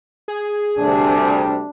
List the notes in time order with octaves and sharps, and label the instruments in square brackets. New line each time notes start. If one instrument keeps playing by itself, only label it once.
[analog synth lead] G#4
[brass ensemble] D2 C3 G3 [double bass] D4